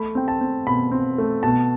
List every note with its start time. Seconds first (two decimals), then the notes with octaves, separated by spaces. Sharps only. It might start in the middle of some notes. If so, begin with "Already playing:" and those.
Already playing: A3 B5
0.15 C4 G5
0.28 A5
0.41 C4
0.67 B2 B5
0.92 C4
1.18 A3
1.43 B2 A5